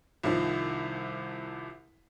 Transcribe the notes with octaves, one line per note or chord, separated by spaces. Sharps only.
C2 C3 D#3 F3